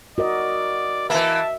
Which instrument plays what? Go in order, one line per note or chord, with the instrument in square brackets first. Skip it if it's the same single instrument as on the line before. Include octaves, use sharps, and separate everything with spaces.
[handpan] F#4 A#4 D#5 [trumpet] D5
[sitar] E3 A#3 [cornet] E5 [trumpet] A5